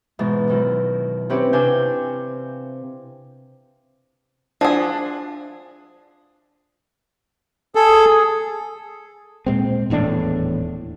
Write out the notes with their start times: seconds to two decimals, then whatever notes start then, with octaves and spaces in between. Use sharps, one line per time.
0.19 G#2 B2 E3
0.48 F#2 D#3 E4
1.30 C4 C#4 E4 G4 B4 C#5
1.53 C3 C4 D4 F5 G#5 G6
4.61 F3 D4 G#4
7.75 G#4 A4
9.46 A#2 G#3 C4
9.90 D#1 E2 A2 D4